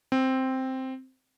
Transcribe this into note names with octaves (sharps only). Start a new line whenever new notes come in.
C4